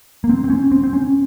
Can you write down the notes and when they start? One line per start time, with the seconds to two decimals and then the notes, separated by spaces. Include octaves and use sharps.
0.24 A#3
0.29 C4
0.44 C4
0.50 C#4
0.71 C4
0.83 C4
0.93 C#4